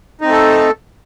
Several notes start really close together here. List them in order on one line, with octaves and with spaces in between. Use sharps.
D#4 C4 A3 A4